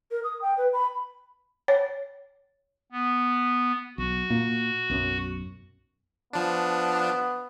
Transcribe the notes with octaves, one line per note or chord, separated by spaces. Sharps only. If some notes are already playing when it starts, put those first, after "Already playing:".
A#4
D#6
G5
B4
B5
C#5
B3
B1 F#4
A#2 A#3
B1 F#2
F3 B3 D4